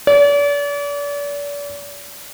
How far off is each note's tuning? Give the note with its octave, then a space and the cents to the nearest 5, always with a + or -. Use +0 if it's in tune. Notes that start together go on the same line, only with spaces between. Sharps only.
D5 -40